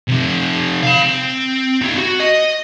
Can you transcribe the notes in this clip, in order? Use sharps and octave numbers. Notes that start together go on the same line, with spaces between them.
C3 F3
F5 B5
C4
D#4 F4
F#4
D#5